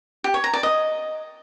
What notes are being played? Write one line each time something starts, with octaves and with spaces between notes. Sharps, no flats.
G4
C#5
A#5
D5
D#5